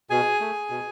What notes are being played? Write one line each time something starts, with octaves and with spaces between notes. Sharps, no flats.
B2 G#4 G#5
A3
B2